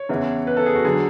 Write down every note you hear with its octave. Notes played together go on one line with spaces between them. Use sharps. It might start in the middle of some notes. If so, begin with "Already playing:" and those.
Already playing: C#5
E2 C#3 E3
B4
A4
G#4
F#4
D3 F#3 G#4